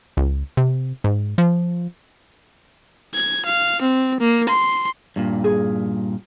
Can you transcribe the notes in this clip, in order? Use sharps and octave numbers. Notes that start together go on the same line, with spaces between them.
C#2
C3
G#2
F3
G#6
F5
C4
A#3
C6
G2 A#2
G#4